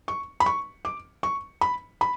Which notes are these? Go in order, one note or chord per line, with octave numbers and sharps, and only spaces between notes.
C#6
B5
C#6
D6
C#6
B5
B5